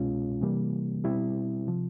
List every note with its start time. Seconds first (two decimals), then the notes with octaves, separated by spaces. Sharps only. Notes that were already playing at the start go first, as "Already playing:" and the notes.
Already playing: C2 B2 G#3 C#4 F4
0.41 C3 E3 G3 A#3
1.04 B2 G3 C4 E4
1.67 C3 F3